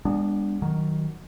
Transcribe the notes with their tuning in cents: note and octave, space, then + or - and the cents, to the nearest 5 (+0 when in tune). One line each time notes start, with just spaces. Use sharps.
G#3 -40 B3 +0 D4 +0
D#3 +0 F#3 +5